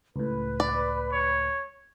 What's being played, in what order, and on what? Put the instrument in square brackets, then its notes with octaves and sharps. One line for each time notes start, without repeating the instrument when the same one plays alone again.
[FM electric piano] C#2 A2 [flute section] B4
[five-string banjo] D5
[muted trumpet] C#5